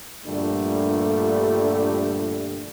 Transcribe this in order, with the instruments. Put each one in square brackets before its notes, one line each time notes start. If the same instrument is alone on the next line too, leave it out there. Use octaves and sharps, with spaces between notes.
[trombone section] G2 A#2 D3 F3 G3 A3